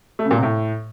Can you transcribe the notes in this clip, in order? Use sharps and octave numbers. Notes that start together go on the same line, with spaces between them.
A3
C#3
A#2
C3
A2